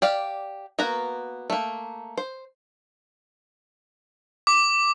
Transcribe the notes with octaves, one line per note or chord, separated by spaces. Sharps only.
G4 D5 F5
A#3 B3 F#4 A#5
A3 A#3
C5
D6